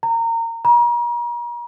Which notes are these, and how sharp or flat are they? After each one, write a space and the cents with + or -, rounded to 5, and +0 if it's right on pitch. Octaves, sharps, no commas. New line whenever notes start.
A#5 -25
A#5 +40